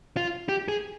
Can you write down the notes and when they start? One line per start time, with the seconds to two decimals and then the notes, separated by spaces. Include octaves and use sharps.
0.17 F4
0.49 G4
0.68 G#4